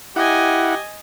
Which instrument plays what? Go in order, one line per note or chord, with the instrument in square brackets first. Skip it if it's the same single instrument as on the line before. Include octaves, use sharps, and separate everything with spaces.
[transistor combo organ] E4 F#5 [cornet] G4 [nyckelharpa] D#5 G#5